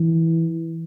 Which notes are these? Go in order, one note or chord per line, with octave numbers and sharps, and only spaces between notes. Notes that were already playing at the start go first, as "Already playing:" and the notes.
Already playing: E3